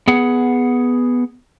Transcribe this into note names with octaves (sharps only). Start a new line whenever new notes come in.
B3 G#4 F#5